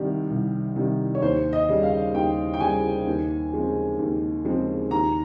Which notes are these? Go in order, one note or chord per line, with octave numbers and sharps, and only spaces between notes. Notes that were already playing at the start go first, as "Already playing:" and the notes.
Already playing: C2 C3 D#3 G3
C2
C3 D#3 G3
C#5
D#2 C5
D#5
C#3 G3
F5
D#2 G5
G5
C#3 G3 G#5
D#2
C#3 F3 G#3 C4
D#2
C#3 F3 G#3 C4
D#2 A#5